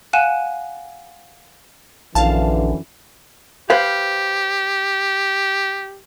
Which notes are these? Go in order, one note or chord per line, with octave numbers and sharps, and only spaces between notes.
F5 F#5 G#5 F#6 D#7 E7
A#1 F#2 D3 E3 F5 A5
G4 B4 C5 F5